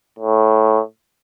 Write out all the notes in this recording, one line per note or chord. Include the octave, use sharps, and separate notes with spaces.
A2